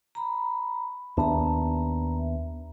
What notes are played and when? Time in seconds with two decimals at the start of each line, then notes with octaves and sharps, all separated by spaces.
0.15 A#5 B5
1.17 D#2 B3 D4 E5 A#5